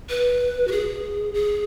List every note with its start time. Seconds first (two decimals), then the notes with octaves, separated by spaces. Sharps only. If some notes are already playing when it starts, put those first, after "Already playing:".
0.10 B4
0.68 F#4
0.72 G#4
1.34 G#4